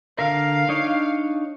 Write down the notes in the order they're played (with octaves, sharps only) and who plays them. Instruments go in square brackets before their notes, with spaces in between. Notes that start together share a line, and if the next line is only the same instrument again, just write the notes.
[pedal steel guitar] D3 A#4 [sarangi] F5
[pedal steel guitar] D4 D#4 C#5